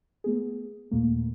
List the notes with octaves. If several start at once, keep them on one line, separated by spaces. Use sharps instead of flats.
A3 B3 G#4
D#2 A#2 A3 A#3